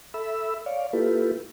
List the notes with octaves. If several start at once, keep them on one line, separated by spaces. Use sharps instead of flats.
A4 E5 B5 E6
C#5 D5 F5
A#3 E4 F4 G4 A4 B4